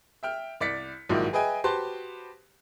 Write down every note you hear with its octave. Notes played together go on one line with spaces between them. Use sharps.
E5 G5 F6
C2 D5 A6 B6 C#7
A#1 G#2 D#3 F3 F#3 E4
G#4 B4 D#5 E5 G5 G#5
F#4 G4 B4 C5 A5 C6